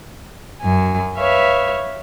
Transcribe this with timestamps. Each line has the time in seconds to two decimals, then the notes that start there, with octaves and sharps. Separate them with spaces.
0.62 F#2 G#5
1.18 B4 C#5 E5 F5